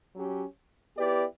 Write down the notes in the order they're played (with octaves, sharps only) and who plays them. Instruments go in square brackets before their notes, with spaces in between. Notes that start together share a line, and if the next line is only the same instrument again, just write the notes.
[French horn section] F#3 C#4 G4
B3 E4 G4 B4 D5